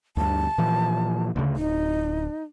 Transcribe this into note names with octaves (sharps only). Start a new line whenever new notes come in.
D2 G2 A5
A#2 E3 F3
D2 C#3
D1 D#4